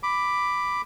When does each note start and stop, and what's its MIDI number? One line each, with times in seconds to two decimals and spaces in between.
0.03 0.82 83
0.03 0.82 86